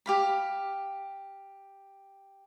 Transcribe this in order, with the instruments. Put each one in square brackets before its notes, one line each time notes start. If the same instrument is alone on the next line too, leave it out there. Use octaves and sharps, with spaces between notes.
[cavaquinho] G4 F5 B5